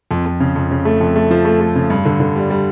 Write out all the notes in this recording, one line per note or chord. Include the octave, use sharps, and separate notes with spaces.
F2
F2
C#3
F2
C#3
A3
F2
A3
F3
A3
A3
C#3
G2
D3
D3
G3
G3